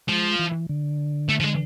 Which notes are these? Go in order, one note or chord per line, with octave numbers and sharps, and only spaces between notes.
F3 G#3
E3
D3
A3
F3
G#3